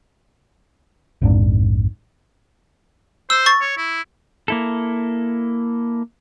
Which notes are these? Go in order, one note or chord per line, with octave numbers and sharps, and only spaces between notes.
A#1 F2 G#2 D4
C5 E6
C#6 A6
C#5
E4
A#3 E4 A4